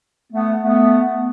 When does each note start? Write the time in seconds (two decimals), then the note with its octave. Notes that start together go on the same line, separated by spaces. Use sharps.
0.33 A3 B3
0.62 A3 B3